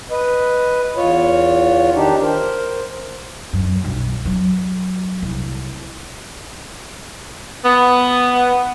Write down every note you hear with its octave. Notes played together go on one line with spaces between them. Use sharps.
B4 D#5
E2 F4 C#5
D#3 D4 D#4 G4
A#4 C5
F#2
B1
F#3
C2
B3